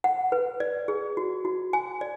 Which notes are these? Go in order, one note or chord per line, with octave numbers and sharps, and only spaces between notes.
F#5
B4
D5
G#4
F#4
F#4
G#5
D5